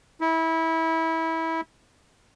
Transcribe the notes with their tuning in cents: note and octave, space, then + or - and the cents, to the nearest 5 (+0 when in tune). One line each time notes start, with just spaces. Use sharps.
E4 -25